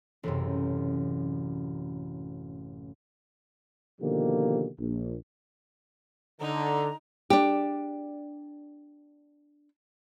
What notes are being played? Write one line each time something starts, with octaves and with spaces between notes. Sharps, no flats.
A1 F#2 C3
B2 D3 D#3 F3 A#3 G4
A#1
D3 D#4 A#5
D4 G4